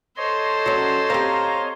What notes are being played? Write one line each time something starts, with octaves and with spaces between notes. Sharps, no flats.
A4 C5 C#5 D#5 C6
F#3 C#4
C4 G4 F5 A#5